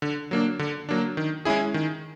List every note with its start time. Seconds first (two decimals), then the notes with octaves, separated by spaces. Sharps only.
0.02 D3
0.31 F#3 A#3 D4
0.59 D3
0.89 F#3 A#3 D4
1.17 D#3
1.45 G#3 C#4 E4 G#4
1.74 D#3